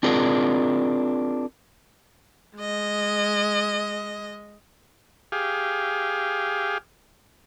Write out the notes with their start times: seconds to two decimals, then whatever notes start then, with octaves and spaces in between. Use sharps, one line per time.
0.03 C4 D4 F4 G#4 A#4
2.57 G#3 D#5
5.32 G4 G#4 F5